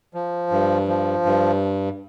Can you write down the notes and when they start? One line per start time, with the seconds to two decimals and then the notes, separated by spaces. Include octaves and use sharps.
0.14 F3
0.51 G2
0.88 F3
1.25 G2